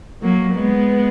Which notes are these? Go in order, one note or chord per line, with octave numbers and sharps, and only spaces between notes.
F#3 A#3
G#3 B3